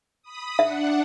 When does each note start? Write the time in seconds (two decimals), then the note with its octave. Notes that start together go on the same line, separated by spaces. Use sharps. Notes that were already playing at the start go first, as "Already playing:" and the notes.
0.22 B5 D#6
0.59 D4 E5 F#5